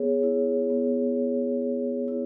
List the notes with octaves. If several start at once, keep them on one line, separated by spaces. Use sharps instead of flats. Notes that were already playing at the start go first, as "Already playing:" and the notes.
Already playing: B3 G#4 C#5
E4
B3
C#5
G#4
E4